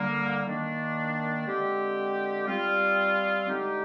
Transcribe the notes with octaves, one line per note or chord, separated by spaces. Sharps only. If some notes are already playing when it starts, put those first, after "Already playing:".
Already playing: D3 G3 A#3
D#3 A#3 D4
D3 G#3 C4 G4
G3 C4 F4
D3 G#3 D#4 G4